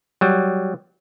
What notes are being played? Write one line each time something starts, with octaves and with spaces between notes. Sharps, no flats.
F#3 G3